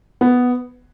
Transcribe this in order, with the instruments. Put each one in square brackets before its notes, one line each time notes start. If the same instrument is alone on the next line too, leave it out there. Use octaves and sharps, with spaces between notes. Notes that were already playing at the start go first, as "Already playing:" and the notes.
[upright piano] B3